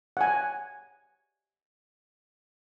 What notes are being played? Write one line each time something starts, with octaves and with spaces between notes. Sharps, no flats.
F#5 G#5